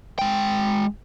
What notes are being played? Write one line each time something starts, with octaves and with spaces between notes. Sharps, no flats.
G#3 G5